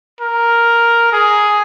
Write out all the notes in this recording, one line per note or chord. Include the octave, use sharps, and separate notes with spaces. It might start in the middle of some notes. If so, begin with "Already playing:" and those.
A#4
G#4